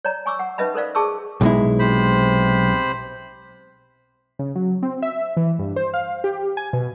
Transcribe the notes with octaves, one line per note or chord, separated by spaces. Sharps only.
C#5 D5 A#5
G#5 C#6 D6 E6
F#5
C#4 D#4 B4 D#5 E5 B5
A4 A#4 C5 D5 F5
G#4 A5 C#6 D6 E6
B1 G#3 E4
C3 C5 B5
C#3
F#3
C4
E5
E3
G2
C5
F5
G4
G#5
B2